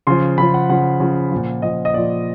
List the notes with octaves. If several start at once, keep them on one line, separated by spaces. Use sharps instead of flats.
C#3 F3 C6
C#3 F3 B5
F#5
C#3 F3 F#5
C#3 F3
A#2 F3
A#2 F3 D#5
D#5
A#2 F3 D5